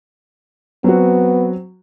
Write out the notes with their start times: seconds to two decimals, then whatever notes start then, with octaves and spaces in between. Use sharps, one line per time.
0.84 F#3 B3 C4 F#4